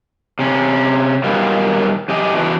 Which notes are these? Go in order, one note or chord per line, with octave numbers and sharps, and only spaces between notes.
C3 C#4
A#2 D#3 F#3 G3 A#3 B3
F#2 G4 D#5 G#5
E3 C#4 D4 F#4 B4 C5